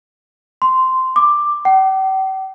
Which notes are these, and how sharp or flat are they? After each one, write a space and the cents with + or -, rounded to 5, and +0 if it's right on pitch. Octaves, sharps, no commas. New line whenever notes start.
C6 -10
D6 +10
G5 -45